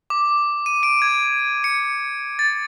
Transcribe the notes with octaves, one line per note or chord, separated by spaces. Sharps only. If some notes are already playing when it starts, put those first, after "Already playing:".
D6
D#7
D7
G#6
C#7
A6